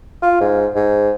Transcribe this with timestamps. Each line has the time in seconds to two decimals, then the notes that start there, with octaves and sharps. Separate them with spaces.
0.22 F4
0.41 G#2
0.75 G#2